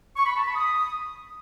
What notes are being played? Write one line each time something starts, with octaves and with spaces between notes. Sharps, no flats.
C#6
B5
A5
B5
D#6